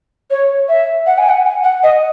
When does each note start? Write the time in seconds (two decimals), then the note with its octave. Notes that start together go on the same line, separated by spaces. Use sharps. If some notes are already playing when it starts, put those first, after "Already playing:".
0.31 C#5
0.69 E5
1.07 F#5
1.18 G#5
1.29 F#5
1.45 G#5
1.63 F#5
1.83 D#5